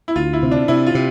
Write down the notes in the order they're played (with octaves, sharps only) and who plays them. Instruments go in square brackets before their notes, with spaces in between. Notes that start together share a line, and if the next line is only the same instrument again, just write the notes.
[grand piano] E4
[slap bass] D2 [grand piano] F4
[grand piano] E4
[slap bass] C3
[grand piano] D4
[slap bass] C3 [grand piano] E4
[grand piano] F4
[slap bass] C3